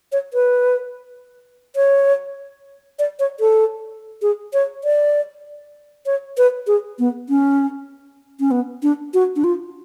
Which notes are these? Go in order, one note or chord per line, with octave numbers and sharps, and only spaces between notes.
C#5
B4
C#5
D5
C#5
A4
G#4
C#5
D5
C#5
B4
G#4
B3
C#4
C#4
B3
D4
F#4
D4
F4